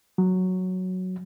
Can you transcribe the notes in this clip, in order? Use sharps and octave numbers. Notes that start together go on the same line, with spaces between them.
F#3